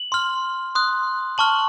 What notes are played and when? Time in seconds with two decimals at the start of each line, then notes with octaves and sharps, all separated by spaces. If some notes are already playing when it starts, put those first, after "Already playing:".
Already playing: F#7
0.12 C6 F6
0.75 C6 D#6 F#6
1.38 A5 C#6 F6 F#7